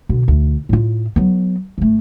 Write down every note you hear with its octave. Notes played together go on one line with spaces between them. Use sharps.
B2 D3
D2
A2 F4
F#3 B3
G#1 A3